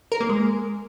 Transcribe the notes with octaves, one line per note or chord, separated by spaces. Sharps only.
A#4
A#3
G#3